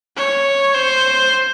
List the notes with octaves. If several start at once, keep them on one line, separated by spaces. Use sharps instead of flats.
C#5
C5